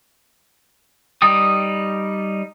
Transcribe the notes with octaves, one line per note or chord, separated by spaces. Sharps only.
G3 D#4 G5 D#6